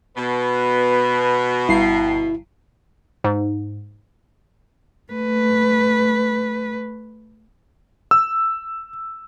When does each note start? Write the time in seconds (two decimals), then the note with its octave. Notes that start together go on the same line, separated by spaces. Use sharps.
0.17 B2 B4
1.69 G1 E4 C7
3.24 G#2
5.12 A3 B4
8.11 E6